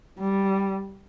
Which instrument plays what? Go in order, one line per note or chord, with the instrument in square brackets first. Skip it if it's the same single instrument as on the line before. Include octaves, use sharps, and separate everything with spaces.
[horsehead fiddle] G3